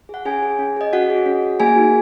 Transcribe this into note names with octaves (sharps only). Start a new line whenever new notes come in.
G#4 F#5
C#4 G#4 G#5
G#4
C#4
G#4 D#5
C#4 F#4 F#5
G#4
C#4
G#4
A#3 G#4 G#5
D#4 F#4